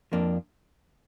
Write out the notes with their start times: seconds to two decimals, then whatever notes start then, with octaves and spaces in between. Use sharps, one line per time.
0.12 F2 F3 A#3 D4